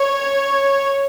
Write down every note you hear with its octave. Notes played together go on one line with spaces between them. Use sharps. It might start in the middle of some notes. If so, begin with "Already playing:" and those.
Already playing: C#5